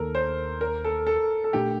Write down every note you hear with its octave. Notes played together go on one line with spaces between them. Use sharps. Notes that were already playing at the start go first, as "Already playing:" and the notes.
Already playing: D#2 D#3 A#3 A4 A#4
C5
A#4
A4
A4
A4
A#2 A3 D4 G4